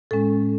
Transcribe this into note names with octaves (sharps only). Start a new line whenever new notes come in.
A2 G#3 C#4 A4